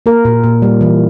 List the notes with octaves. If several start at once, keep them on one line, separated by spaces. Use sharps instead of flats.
A#3 A#4
A#2
A#2
G3
E3